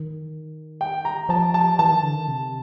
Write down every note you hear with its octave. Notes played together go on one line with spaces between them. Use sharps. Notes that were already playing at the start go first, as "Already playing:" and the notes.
Already playing: D#3
G5
A#5
F3 A5
A5
E3 A5
D#3
D3
D#3
C3